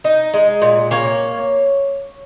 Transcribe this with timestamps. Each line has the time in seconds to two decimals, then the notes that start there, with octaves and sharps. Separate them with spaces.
0.04 D#4
0.34 G#3
0.62 A#2
0.91 A#3 C#5